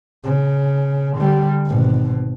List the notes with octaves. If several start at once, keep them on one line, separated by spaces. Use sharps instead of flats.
C#3
D3 G3
G#1 B2